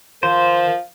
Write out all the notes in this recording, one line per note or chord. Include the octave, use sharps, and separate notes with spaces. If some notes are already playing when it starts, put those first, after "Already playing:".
D#3 F3 C5